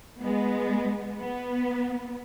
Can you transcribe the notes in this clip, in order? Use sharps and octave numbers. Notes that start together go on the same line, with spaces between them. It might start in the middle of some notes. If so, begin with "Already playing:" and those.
G#3 B3
B3